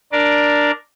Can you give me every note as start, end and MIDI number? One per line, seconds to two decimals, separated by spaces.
0.12 0.71 62
0.12 0.71 70
0.12 0.71 74